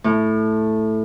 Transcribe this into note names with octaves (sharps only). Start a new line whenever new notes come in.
A2